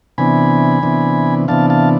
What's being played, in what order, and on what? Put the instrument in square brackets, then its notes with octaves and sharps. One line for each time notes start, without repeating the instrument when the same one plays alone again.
[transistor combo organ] C3 E3 B3 D4 G#5 B5
C3 E3 B3 D4
C3 E3 B3 D4 F5 A5
F5 A5